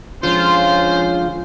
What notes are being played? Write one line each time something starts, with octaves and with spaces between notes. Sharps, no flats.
D3 F3 G#3 C#4 F4 C5